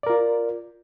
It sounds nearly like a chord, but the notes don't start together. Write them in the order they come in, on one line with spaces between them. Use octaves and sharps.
D5 A#4 F4